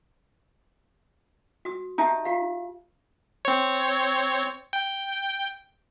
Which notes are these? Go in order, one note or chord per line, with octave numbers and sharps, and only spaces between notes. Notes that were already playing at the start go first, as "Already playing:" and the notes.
F#4 D#6
D#4 G4 E5 A5
F4 G4 F5
C4 C#5
G5